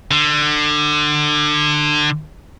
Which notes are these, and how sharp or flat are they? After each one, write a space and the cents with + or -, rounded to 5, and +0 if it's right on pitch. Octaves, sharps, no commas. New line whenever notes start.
D3 +25